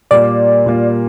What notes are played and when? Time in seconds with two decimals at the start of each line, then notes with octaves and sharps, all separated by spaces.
0.11 A#2 G3 A#3 F4 D5
0.66 A#2 G3 A#3 F4